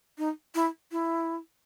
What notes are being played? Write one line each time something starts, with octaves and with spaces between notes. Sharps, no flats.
D#4
E4
E4